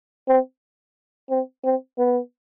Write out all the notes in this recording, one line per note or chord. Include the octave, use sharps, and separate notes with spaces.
C4
C4
C4
B3